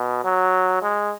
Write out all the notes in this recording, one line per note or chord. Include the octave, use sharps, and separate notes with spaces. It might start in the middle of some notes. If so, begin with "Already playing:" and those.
Already playing: B2
F#3
G#3